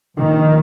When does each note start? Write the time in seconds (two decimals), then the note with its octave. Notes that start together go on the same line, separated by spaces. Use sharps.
0.17 A#1 A#2 D#3